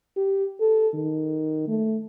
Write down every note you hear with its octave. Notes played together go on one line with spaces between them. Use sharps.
G4
A4
D#3
A3